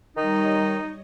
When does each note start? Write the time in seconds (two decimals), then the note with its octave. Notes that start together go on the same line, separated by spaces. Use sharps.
0.16 D#3 G3 D#4 C#5 D#5